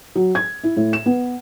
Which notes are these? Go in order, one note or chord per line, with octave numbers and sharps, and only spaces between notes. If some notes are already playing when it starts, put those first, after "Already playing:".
F#3
G#6
E4
A2
E7
B3